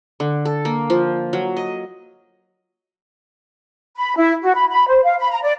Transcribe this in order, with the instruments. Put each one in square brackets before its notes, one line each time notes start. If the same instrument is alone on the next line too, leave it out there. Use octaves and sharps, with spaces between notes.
[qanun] D3
A4
A#3
F3
F#3
D#5
[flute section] B5
E4
F#4
B5
B5
C5
F5
B5
A#5
D5